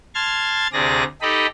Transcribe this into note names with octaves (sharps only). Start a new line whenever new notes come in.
A5 C6 F6 G#6 A6
D2 C3 G#4 D5 A#6
D#4 G4 A4 D#5 B5